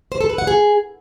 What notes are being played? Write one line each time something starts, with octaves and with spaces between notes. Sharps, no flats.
C5
A4
B4
F#5
G#4